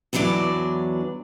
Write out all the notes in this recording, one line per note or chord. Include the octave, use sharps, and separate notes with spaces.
E2 E3 F#3 D4 D5